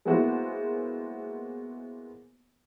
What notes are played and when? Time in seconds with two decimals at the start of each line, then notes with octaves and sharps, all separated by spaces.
0.05 G#3 A#3 B3 E4 F#4 C5